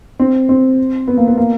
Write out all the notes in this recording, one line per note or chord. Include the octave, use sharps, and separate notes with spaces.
C4
C4
B3
A#3
B3
A#3